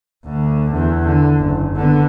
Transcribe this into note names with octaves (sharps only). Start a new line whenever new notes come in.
D2 D3
E2
D3
F#1
D3 B3